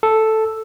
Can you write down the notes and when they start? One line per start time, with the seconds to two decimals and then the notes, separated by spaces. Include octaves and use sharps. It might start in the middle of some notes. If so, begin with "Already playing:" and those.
0.03 A4